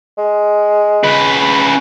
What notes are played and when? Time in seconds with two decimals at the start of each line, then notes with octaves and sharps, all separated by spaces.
0.18 G#3
1.04 C#3 B4